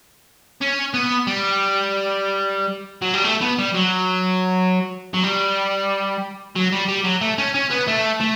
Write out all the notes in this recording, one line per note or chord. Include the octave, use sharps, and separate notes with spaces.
C#4
B3
G3
F#3
G3
A3
B3
G3
F#3
F#3
G3
F#3
G3
G3
F#3
A3
C#4
C#4
B3
A3
A3